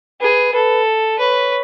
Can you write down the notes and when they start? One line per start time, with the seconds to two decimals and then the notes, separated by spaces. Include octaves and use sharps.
0.21 G#4 B4
0.53 A4 B4
1.19 B4 C#5